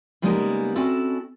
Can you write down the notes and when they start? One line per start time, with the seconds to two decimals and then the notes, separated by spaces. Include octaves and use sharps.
0.22 C#3 G3 G#3 A#3 B3 D#4
0.75 C4 C#4 E4 F#4 A4 D5